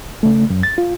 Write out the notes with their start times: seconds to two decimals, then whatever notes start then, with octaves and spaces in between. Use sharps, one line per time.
0.23 C#3 A3
0.50 F#2
0.63 A6
0.78 F4